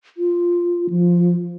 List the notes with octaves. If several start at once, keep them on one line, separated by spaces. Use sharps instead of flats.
F4
F3